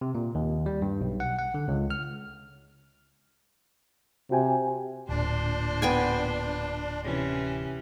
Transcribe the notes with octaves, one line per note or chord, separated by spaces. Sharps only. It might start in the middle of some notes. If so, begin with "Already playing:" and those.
C3
A#2
D#2
G3
G2
B1
F#5
F#5
D3
C#2
F6
C3 F#4 G5 G#5
D1 A#2 D4 C5
B3 G5 G#5
C3 E3 C#4